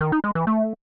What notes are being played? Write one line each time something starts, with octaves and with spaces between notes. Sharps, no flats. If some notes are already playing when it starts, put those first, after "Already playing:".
D#3
D#4
G#3
E3
A3